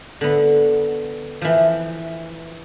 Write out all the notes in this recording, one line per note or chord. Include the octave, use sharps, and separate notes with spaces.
D3 B3
E3 F3